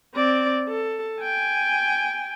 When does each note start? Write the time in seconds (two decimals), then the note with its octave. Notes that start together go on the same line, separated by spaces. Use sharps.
0.15 C4 D5
0.69 A4
1.21 G5 G#5